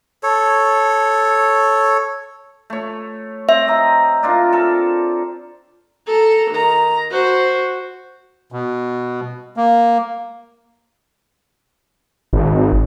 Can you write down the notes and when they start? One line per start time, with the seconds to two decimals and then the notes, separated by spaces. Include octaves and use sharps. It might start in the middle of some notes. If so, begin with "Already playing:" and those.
0.23 A4 C#5
2.70 A3 C#5
3.49 C4 E5
3.68 D#5 A#5
4.23 D4 F4 A#4
4.53 A4 A#4
6.08 A4 A#5
6.52 D#3 A#5
7.11 F#4 C5
8.52 B2
9.57 A#3
12.33 G#1